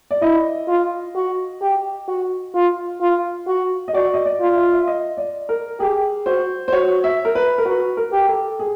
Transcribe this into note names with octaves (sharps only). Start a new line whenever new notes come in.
D5
E4 D#5
F4
F#4
G4
F#4
F4
F4
F#4
D#5
F#4 D5
D#5
D5
F4
E5
E5
D#5
D5
A#4
G4 G#4
F#4 C5
C5
F#4 C#5
E5
A#4
B4
A#4
F#4 B4
A#4
G4
A4
G#4